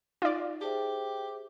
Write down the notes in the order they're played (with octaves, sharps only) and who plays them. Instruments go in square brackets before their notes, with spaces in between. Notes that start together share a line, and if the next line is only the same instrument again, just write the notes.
[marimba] D#4 [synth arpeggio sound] F4 D5
[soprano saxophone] G4 [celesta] G#4 C5 E5 [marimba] G5 A5